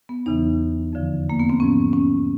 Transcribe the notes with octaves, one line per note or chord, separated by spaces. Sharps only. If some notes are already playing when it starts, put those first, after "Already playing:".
B3
E2 C#3 E3 D#4
F2 D3 F3
A#3
B3
C4
G#2 F3 C#4
C#4